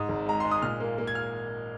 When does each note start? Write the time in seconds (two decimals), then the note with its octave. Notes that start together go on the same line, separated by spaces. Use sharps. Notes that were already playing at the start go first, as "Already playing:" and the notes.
Already playing: G#2 D#6
0.09 G#1
0.27 G#3 A#5
0.40 G#3 C6
0.51 D#6
0.62 A#2 F6
0.80 A#3
0.98 A#3
1.07 G#6
1.15 F6